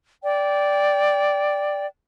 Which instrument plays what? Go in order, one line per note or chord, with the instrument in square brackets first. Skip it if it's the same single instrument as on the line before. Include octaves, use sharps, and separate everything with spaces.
[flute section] D5 G5